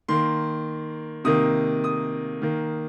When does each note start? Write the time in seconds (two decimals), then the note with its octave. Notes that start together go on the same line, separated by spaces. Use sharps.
0.08 D#3 A#3 C6
1.24 C3 D#3 A#3 D#6
1.84 D#6
2.42 D#3 A#3